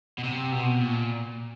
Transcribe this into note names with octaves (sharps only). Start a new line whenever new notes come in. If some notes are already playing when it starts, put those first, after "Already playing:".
B2
C3
B2
A#2